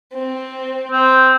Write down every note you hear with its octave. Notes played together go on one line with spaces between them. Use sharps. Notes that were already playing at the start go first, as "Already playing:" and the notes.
C4
C4